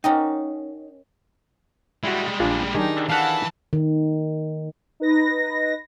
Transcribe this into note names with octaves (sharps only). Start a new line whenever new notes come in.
C#4 D#4 A#4 D#5 F#5 G5
G3 G#3 E4 F#4
A#1 D4 F4 G#5
D#3 D4 D#4 G4 G#4
E3 F5 F#5 A5
D#3
D#4 B4 A#6